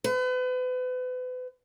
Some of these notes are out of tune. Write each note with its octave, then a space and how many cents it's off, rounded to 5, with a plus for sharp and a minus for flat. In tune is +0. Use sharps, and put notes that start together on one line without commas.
B4 +35